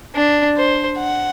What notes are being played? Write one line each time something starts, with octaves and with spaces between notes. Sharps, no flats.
D4
C5
F#5